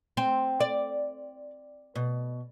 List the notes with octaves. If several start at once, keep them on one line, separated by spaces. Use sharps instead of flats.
C4
D5
B2